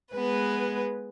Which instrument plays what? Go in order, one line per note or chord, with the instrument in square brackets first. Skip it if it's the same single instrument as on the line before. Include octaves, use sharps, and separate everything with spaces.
[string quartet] G#3 B3 B4